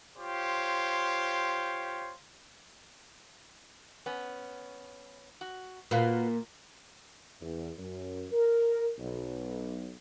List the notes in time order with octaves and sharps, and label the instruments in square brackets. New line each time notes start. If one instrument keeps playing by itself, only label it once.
[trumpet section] F4 G4 C5 C#5
[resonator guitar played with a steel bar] B3 C#4
F#4
[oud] A#2 [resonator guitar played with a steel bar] F#4 B4 F5
[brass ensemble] E2
F#2
A#4
B1